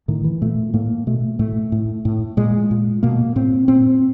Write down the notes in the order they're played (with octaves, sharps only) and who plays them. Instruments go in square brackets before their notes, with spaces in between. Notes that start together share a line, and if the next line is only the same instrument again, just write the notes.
[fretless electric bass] A2 D#3
E3
A#2 A3
A2 A#3
B2 A3
A2 A3
A2
A2
A#2 G#3
A#2
B2 A#3
A2 C4
A#2 C4